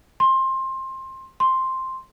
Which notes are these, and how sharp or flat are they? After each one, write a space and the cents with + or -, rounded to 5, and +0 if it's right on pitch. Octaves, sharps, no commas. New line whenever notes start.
C6 +20
C6 +5